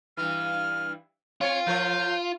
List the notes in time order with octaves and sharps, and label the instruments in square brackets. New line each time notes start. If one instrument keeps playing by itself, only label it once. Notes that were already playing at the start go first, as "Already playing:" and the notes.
[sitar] G2 E3 [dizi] F6
[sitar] C4 [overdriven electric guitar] F4 [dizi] C#5
[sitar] F3 A#4 C#5 [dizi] G6